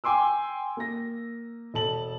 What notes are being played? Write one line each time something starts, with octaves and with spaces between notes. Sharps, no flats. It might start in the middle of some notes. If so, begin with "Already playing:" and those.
G5 G#5 C6 D6 E6
A#3 A#6
E1 A4 A5 F#7